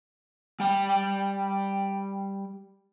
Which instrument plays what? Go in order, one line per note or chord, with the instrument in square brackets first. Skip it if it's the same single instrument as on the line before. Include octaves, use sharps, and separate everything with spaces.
[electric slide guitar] G3 G5